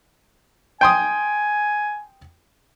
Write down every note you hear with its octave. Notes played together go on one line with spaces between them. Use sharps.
G5 G#5 C6 D#6